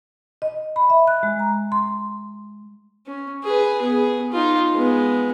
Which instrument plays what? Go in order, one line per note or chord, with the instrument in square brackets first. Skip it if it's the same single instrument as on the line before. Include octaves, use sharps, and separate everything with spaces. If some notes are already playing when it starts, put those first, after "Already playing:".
[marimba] D#5
B5
E5
F#6
G#3
A#5
C6
[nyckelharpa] C#4
G#4 B4
B3 G#4
D#4 F4
G#3 B3